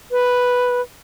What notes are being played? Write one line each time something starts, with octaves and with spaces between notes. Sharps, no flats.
B4